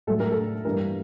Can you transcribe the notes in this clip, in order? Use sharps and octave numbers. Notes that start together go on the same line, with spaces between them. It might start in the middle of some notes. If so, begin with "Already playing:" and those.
A2 F#3 A3 A4
A#4
A4
G2 E3 G3 A#3 A#4